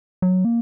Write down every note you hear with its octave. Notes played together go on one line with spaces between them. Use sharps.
F#3
A#3